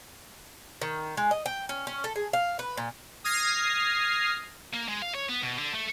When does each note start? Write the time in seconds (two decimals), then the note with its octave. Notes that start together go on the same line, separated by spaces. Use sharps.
0.82 D#3
1.17 G#3
1.31 D#5
1.46 G5
1.69 C#4
1.87 C#4
2.04 A4
2.16 G#4
2.33 F5
2.59 B4
2.77 A#2
3.24 D#6 F6 G#6 A#6 C7
4.73 A#3
4.88 G#3
5.02 F5
5.15 C#5
5.29 B3
5.43 B2
5.58 D3
5.74 A3